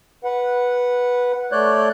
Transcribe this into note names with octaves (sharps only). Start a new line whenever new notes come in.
B4 F#5
A3 C#5 D5 F#6 G6